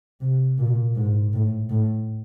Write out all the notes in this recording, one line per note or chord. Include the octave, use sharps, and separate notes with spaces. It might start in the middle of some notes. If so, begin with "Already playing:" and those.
C3
A#2
G#2
A2
A2